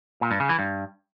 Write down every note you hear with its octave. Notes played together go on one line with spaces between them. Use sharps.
A#2
G2
C#3
E3
G2